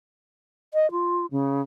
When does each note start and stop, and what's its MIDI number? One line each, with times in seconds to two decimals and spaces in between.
0.74 0.90 75
0.91 1.26 65
1.32 1.62 49